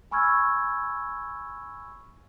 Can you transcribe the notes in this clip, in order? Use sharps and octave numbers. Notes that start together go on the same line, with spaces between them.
G#5 B5 C#6 E6 F6 G#6